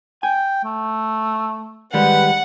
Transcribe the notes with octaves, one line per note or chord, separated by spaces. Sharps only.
G5 G#5
A3
D#3 G3 G#3 B4 F#5